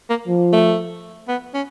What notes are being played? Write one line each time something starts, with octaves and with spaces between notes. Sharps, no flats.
A#3
F3
A3
B3
C#4